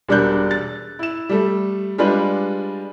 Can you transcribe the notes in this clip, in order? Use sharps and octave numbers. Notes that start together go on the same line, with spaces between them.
E1 G3 D4 A#4 F#6 G6
A6
E4 E7
G3 A3
G3 G#3 D4 F4 B4